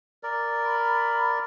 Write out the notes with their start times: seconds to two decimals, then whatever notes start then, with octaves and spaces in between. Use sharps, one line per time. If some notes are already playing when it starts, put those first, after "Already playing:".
0.23 A#4 D5
0.64 B5